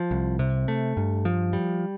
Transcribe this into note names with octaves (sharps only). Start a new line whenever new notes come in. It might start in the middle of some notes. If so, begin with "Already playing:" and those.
Already playing: F3
C2
C3
A3
G2
F3
G3